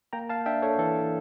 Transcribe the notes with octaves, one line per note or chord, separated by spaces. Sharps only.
A#3 G5 A#5
F5 A5
D4 E5 G5
A4 C#5
E3 A4